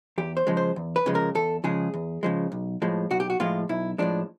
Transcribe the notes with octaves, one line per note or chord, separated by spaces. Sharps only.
E2 G4
C5
C#3 F3 G#3
C5
E2
B4
C#3 F3 G#3
A#4
E2 A4
C#3 F3 G#3 G#4
E2
C#3 F3 G#3
B1
A2 F3 G#3
B1 F#4
G4
F#4
A2 F3 G#3 F4
B1 E4
A2 F3 G#3 D4